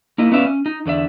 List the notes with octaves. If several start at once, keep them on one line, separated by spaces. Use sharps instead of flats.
A#3 D#4 E4 D#5
B3 C#4 B4 D5 E5 F5
C#4
D#4
E2 D3 D5 E5